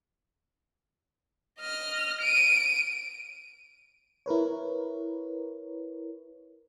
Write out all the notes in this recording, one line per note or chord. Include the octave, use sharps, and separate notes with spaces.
D#5 F6
D7 D#7
E4 A#4 B4 C#5